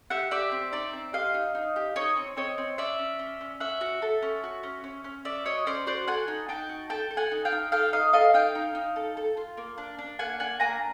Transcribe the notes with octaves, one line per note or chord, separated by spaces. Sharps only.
G4 E5 F#5
G4 D5 E5
C4
D#4 D5 E5
C4
G4 D#5 F5
D#4
D#4
G4
D#4 C#5 D#5
C4
C4 C#5 D#5
C4
C#4 D5 E5
C#4
C#4
C#4
C#4 E5 F#5
F#4
A4
C#4
F#4
C#4
C#4
C#4
C#4 D5 E5
F#4 C#5 D#5
C#4 C5 D5
F#4 C5 D5
A4 F#5 G#5
D#4
D#4 G5 A5
F#4
A4 G5 A5
A4
F#5 G#5
D#4
F5 G5
D#4
A4 F5 G5
D#4 D#5 F5
A4 D#5 F5
D#4 F5 G5
D#4
D#4
A4
A4
F4
A#3
D4
D4
A#3 F#5 G#5
D4 F#5 G#5
A#3 G#5 A#5